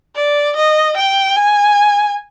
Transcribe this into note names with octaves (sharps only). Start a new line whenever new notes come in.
D5
D#5
G5
G#5